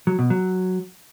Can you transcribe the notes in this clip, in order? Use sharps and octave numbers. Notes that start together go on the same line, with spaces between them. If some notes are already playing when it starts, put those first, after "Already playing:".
F#3
B2
F#3